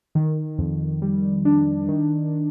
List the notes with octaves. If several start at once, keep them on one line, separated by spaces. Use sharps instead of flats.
D#3
F2
G3
D4
D#3